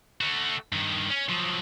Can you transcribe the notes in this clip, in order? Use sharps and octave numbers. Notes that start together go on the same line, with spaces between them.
A3 F#4
G2 D#3
C#4
F3 F#3